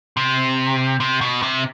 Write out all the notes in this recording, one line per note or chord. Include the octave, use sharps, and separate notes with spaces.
C3
C3
B2
C3